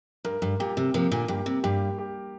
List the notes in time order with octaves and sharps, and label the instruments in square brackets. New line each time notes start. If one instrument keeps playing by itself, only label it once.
[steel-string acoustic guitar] G2 [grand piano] A#4
[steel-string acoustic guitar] G2
[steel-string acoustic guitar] A#2 [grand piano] G4
[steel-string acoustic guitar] C3
[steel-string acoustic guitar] C3 F3 [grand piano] A#3
[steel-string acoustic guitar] A#2 D3
[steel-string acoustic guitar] G2 [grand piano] G4
[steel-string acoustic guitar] C3
[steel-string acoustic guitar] G2 [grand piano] G4
[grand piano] G4